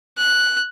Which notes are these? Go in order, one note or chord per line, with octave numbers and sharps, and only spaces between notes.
F#6